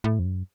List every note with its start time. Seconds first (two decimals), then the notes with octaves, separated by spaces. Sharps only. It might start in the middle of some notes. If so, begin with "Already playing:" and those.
0.04 A2
0.19 F2
0.25 F#2